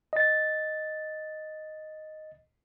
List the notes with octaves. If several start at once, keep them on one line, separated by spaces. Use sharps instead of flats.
D#5 A6